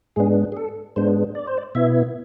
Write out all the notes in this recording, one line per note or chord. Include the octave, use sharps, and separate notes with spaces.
G#2 G#3 B3 D4 G#4
G#4
A4
G#2 G#3 B3 D4 C5
D5
C5
D5
B2 B3 E4 E5